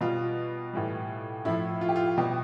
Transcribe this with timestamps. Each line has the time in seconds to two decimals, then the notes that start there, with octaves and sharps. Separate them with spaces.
0.01 B2 G3 F4
0.73 A2 E3 G3
1.45 A2 F3 E4
1.81 F4
1.89 G4
1.96 F4
2.17 B2 G3 G4